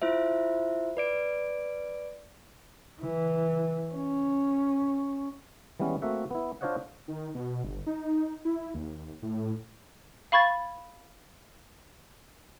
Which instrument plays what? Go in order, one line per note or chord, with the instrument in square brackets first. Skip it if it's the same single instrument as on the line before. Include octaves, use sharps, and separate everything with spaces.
[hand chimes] E4 F4 C5 E5
B4 D5 D7
[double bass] E3
C#4
[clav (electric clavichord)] E3 G3 G#3 B3 C#4
A3 A#3 C4 F#4 E5 F#5
B3 E4
D4 F4 C5 C#5 D#5 F#5
[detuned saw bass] D#3
B2
G1
D#4
E4
D#2
A2
[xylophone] F5 B5 C#6 G#6 A6